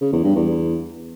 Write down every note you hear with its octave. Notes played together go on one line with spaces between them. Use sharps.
C#3
E2
G2
E2